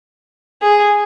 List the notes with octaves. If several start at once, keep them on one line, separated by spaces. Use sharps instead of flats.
G#4